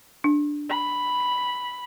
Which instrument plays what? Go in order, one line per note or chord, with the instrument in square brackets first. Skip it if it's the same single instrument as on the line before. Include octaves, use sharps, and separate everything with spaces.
[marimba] D4
[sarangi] B5